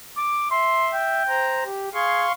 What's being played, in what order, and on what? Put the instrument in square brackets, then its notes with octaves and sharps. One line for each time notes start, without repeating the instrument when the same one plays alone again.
[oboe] D6
[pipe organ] E5 [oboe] C6
[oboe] G5
[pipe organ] C5 A#5
G4
[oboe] G#4 [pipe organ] F5 C6 C#6